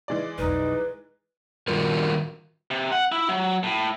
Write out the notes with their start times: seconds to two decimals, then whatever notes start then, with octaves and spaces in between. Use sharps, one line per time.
0.08 E3 G#3 D5
0.38 B1 F2 D#4 B4
1.68 D#3 G3 F4 F#4 A#4
2.71 C3
2.92 F#5
3.12 E4
3.29 F#3
3.63 A2